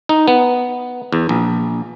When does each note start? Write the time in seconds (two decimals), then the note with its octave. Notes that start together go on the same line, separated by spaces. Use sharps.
0.09 D#4
0.28 B3
1.13 E2
1.29 A#1